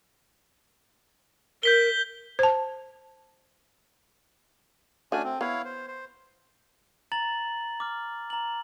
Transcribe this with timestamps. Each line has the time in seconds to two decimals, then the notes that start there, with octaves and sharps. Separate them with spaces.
1.63 A#4 G6 B6 G7
2.39 C5 A5
5.12 A3 C#4 D4 F#4 G#5
5.24 C4
5.41 B3 E4 C#5 F5
5.65 C5
5.88 C5
7.12 A#5 A6 F#7
7.80 D6 F6
8.30 A#5 F#7